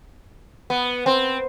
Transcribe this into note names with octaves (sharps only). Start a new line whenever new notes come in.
B3
C4